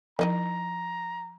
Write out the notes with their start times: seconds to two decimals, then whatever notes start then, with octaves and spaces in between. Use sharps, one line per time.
0.19 D#3 F3 D#4 E4 A#5